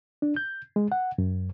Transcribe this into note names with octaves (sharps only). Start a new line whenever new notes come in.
D4
G6
G#3
F#5
F#2